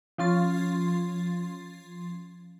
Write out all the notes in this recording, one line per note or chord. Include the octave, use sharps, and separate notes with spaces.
F3 C#4 F4 C6 A6